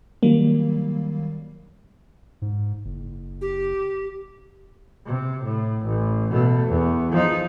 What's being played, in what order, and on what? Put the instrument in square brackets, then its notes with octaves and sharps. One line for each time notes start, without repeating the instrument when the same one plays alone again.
[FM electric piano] D#3 F#3 G3 A#3
[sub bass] G#2
F#1
[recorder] G4
[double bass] C3
A2
A1
B2 A3
E2
F3 D#4